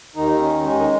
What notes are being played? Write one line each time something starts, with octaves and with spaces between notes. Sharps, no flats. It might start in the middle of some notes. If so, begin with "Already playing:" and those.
D#2 D#3 D#4
C#4
G#3
D#3 D#4